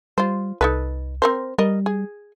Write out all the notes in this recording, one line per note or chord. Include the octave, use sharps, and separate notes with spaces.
G3 F4 C5
C2 D#4 A4 B4
C4 A#4 C5
G3 A#4 D#5
G#4